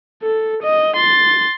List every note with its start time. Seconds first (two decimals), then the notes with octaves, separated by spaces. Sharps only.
0.23 A4
0.63 D#5
0.96 C6 A6